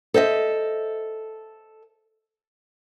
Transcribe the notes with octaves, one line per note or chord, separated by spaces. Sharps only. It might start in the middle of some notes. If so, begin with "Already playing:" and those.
A4 C5 D#5 E5